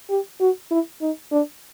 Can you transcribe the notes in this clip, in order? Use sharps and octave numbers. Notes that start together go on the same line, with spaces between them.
G4
F#4
E4
D#4
D4